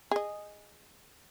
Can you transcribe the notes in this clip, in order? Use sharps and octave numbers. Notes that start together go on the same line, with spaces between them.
G#4 D#5